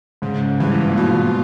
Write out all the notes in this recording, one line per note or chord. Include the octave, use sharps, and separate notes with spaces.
G#2 C#3
G2 E3
A#2
B2 F4